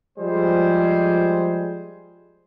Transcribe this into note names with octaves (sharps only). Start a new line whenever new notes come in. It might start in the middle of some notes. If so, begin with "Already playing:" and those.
F3 G3 G#3 G#4 C5